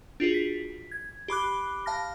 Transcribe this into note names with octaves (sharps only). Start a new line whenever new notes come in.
D4 F4 F#4 G#4
B6
G#6
G4 B5 D6 F#6
F5 A5 F6 A#6